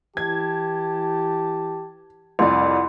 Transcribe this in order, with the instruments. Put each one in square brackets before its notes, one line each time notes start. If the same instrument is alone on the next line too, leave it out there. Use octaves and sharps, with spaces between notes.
[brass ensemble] E3 G4 A5 [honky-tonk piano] G#6
[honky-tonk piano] C2 F2 D5 [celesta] C6